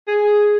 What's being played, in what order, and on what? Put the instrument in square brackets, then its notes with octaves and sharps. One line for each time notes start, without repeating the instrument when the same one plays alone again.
[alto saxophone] G#4